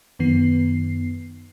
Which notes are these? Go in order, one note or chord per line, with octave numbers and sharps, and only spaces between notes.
F#2 D#3 B3 C7